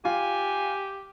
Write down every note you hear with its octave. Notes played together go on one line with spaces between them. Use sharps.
F4 G4 G#5